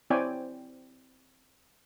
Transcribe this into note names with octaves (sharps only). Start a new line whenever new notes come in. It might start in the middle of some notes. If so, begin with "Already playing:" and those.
C4 E4 C#5 D5 G5 G#5